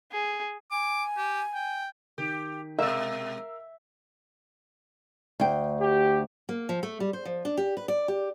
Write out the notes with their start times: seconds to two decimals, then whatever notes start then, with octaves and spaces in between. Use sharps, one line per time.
0.12 G#4
0.71 G#5 D6
1.17 G4
1.54 G5
2.18 D#3 G4
2.79 B2 G#3 A#4 E5 F5 E6
5.40 D2 G5
5.80 G4
6.49 A#3
6.69 F3
6.83 A3
7.00 G3
7.13 C5
7.25 F3
7.45 D4
7.57 G4
7.77 B4
7.88 D5
8.08 G4